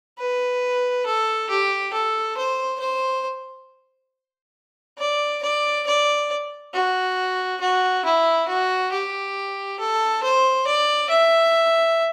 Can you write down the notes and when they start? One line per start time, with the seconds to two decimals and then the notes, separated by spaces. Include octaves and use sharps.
0.19 B4
1.06 A4
1.49 G4
1.93 A4
2.37 C5
2.80 C5
4.98 D5
5.43 D5
5.86 D5
6.74 F#4
7.61 F#4
8.05 E4
8.48 F#4
8.92 G4
9.79 A4
10.23 C5
10.67 D5
11.10 E5